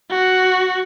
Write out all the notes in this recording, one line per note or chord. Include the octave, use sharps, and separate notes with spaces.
F#4